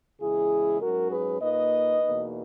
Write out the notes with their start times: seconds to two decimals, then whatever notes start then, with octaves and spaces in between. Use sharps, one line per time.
0.20 E2 C#3 G#3 E4 G#4
0.81 G#2 F#3 C#4 F#4 A#4
1.11 G#4 B4
1.41 A#2 A#3 D#4 B4 D#5
2.02 E2 B2 A#3 D#4